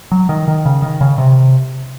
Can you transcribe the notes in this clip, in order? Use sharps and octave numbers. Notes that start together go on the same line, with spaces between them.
F#3
D#3
D#3
C#3
D#3
C#3
C3